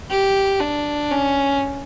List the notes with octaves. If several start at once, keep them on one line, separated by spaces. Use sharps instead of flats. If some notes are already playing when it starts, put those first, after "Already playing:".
G4
D4
C#4